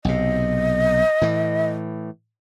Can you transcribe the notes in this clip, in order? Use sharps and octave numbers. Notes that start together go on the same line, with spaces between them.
B1 C3 D#5
A2 E3